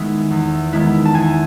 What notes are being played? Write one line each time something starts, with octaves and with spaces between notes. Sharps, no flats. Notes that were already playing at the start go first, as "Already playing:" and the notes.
Already playing: D#3 G#3 B3 E4
E2
D#3 G#3 B3 E4
A5
E2 G#5